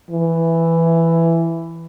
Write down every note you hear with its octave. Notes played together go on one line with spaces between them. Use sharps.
E3